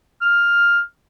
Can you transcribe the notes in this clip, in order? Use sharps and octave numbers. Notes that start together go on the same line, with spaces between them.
F6